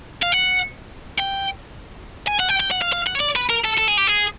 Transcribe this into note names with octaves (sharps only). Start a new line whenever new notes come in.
F5
F#5
G5
G#5
F#5
G5
G5
F#5
F5
F5
F#5
C#5
D5
B4
A#4
A4
A4
G#4
G4
G#4